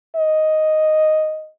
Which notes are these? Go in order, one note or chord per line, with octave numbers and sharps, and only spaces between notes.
D#5